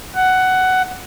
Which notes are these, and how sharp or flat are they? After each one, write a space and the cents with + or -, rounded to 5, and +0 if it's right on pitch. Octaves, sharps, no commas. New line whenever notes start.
F#5 +10